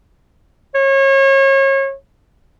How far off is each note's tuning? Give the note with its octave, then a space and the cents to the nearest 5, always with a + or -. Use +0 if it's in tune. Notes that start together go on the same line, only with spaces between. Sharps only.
C#5 -30